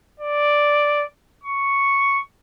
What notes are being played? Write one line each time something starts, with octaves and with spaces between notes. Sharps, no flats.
D5
C#6